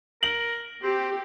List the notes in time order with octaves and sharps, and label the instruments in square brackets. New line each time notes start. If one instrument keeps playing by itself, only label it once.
[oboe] A#4 [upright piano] F#7
[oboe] C4 [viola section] G4